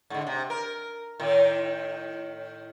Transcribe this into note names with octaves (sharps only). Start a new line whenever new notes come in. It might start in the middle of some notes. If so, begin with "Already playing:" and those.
G#2 D3
C3
A#4
A2 D#3